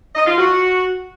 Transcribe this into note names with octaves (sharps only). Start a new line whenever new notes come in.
D#5
F4
F#4